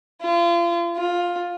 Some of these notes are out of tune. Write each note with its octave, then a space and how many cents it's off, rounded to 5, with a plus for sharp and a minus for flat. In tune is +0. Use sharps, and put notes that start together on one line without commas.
F4 -35
F4 +10